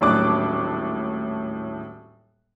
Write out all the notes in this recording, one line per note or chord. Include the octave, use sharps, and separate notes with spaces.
D#1 A2 F#3 D4 D6 F#6